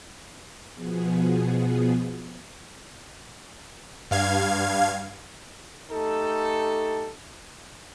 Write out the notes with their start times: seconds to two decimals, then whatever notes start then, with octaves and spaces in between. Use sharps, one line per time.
0.74 B2 F3 B3 G#4
4.11 G2 F5 G#6
5.92 A3 D#4 G4 A4